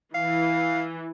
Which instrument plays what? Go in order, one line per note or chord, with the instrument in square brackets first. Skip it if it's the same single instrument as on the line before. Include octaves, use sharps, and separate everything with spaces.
[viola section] E3 [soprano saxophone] F5